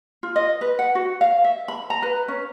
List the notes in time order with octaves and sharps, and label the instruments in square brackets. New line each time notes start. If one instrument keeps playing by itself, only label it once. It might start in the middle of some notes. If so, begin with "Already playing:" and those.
[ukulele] F4
D#5
B4
F#5
F#4
F5
E5
B5
A#5
B4
C#4